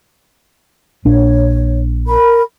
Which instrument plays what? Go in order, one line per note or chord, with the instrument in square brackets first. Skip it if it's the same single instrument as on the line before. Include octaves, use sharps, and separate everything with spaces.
[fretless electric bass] A#1 D4 [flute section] C#5
[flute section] A#4 B5